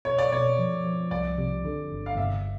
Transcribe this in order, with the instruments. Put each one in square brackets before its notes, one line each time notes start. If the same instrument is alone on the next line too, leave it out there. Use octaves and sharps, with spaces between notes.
[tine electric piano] B2 [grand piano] C#5
[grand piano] D5
[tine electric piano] B2 [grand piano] C#5
[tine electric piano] F3
F3
[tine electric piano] C2 [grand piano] D5
[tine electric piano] C3
D3
G1
[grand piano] F5
[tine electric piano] G1 [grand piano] E5